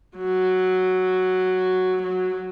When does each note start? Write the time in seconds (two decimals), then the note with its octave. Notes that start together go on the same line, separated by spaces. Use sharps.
0.17 F#3
2.02 F#3